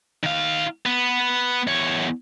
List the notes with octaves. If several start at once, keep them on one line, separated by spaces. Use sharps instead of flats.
D#3 F5
B3
E2 C#5